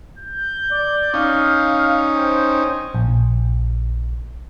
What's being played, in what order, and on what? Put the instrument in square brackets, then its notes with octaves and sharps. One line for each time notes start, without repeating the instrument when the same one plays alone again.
[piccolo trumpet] G6
[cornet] D5
[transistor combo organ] C#4 D#4 [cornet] F5
[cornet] C5 [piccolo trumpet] G5
[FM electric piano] A#1